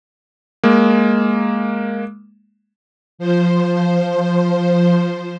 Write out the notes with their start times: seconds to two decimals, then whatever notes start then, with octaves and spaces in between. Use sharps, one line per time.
0.64 G#3 A#3
3.19 F3 C5